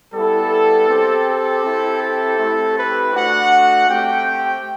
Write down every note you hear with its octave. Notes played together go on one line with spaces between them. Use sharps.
G3 B3 E4 A4
C4 G4
A4
C4 E4 G4
A4
A3 C4 E4 G4
B4
A3 D4 F#4 F#5
A3 C4 G4 G5